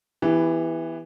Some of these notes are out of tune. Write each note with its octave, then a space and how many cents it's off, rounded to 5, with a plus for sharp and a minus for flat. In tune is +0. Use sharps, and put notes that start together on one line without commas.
E3 +0 B3 +0 G4 +30